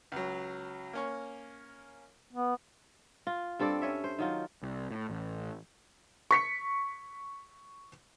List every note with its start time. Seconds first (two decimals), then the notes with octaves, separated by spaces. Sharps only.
0.12 C#2 F#3
0.93 A#3 C#4 C#6
2.33 B3
3.27 F4
3.59 G2 C4 A4 D5
3.82 C#4 C#5 E5
4.04 C5
4.19 D#3 F#3 F4
4.63 C2
4.91 A2
5.10 A1
6.31 C#6 B6 C#7